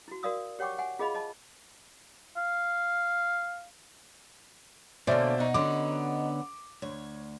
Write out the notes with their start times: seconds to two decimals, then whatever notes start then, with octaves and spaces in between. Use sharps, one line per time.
0.08 E4 F#4
0.23 F#4 A#4 D5 F5 D#6 E6
0.59 G4 C#5 F#5 G5 C#6 D6
0.78 F#5 G#5
0.99 F4 G#4 D#5 F5 B5
1.14 D#5 A5
2.37 F5
5.07 B2 D3 A#3 C#4 C5 D5 E5
5.38 D#4 F#4
5.54 D3 B3 C#4 D6
6.82 D2 C#5